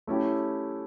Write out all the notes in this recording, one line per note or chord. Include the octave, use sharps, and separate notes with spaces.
A3 C#4 E4 G4